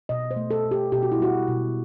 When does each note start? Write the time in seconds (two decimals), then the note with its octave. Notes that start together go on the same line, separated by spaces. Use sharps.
0.09 B2 D#5
0.31 C5
0.36 A3
0.51 A4
0.65 B2
0.71 G4
0.92 B2 G4
1.03 F#4
1.12 E4
1.20 G3 F#4
1.48 B2